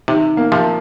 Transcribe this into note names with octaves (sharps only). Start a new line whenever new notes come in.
C3 D#3
A#3
C3 F3